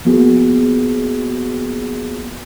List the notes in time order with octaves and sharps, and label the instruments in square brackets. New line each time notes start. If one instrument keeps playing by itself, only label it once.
[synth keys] F3 A#3 B3 F#4 G#4